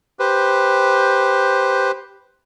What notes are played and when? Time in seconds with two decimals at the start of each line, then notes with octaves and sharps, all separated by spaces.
0.19 G4 B4 C5